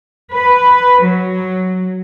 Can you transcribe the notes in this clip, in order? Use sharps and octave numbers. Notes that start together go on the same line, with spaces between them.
B4
F#3